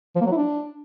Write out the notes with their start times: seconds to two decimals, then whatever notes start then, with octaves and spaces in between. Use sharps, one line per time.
0.16 F3
0.21 A#3
0.26 F#3
0.32 E4
0.37 D4